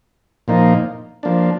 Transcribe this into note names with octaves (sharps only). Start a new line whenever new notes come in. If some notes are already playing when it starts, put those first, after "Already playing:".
A#2 F3 A#3 D#4
F3 A#3 D4